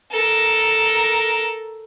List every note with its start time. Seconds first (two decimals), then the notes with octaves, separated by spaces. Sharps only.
0.12 A4 A#4